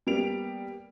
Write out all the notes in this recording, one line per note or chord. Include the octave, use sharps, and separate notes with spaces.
G3 A#3 B3 D7 F7